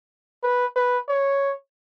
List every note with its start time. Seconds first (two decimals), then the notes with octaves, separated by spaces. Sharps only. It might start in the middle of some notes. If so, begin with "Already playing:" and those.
0.43 B4
0.76 B4
1.08 C#5